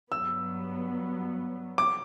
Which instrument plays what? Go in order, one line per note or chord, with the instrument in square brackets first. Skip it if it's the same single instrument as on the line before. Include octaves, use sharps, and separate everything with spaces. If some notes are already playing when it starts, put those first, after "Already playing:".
[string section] G2 F#3 B3 [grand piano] E6
[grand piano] D6